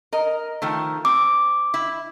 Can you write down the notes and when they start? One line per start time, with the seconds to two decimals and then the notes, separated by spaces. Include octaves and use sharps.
0.13 A#4 D#5
0.62 D#3 F3 A3
1.05 C4 D6
1.74 E4